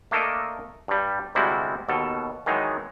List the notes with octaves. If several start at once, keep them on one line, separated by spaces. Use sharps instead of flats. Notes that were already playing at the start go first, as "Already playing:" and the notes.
A3 A#3 D4 A4 A#4 D#5
G2 G3
D2 C3 G3 G#3 E4 F#4
D#2 B2 A4
D#3 E3 F#3 G#3 D#4